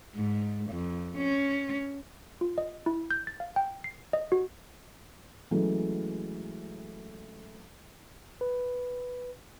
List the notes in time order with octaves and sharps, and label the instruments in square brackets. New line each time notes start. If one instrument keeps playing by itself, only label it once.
[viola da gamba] G#2
F2
C#4
[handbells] F4
D#5
E4
G6
A6
F5
G5
C7
D#5
F#4
[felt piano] E3 F#3 G#3 A3 C#4
[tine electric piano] B4